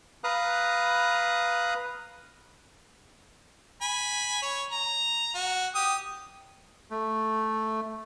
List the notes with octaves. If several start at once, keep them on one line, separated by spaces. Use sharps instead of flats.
B4 F5 A#5 D#6 F#6
G#5 B5
C#5
A#5
F#4
G4 D#6
A3